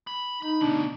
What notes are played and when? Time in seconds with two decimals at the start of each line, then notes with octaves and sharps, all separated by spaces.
0.07 B5
0.42 D#4 B5
0.61 D2 B2 D4